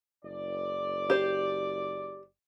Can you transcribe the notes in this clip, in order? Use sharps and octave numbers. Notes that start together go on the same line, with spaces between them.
F#1 D5
G4 C5